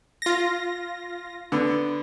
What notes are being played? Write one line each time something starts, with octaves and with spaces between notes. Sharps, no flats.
F4 A#6
D3 B3